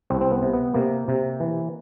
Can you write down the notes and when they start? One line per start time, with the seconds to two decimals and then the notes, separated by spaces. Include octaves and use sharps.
0.10 C2 C4
0.21 C4
0.31 B3
0.42 C3
0.53 B3
0.74 C3 A#3
1.08 C3
1.40 E3